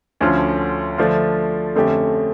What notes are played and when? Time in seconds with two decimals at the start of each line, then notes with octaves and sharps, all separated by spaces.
0.20 D2 D3 F3 C#4 F4
0.98 D3 F3 A3 D4 F4
1.75 F2 D3 A3 C#4 G4